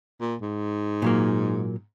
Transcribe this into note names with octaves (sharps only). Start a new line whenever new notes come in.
A#2
G#2
A#2 F#3 A#3